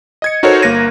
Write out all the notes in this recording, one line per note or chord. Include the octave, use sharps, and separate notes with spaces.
D#5 G#6 C#7
D#4 F#4 A4 A#4 C5 C#5
G1 A#3 A#4 F#6 A#6 D#7